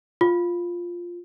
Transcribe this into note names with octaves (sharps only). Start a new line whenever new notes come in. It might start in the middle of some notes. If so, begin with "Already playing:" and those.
F4